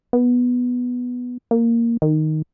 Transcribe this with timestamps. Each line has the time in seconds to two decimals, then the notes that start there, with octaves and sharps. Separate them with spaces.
0.13 B3
1.51 A#3
2.02 D#3